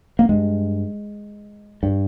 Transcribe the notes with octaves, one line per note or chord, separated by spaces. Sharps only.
A#3
G2 G#3
G2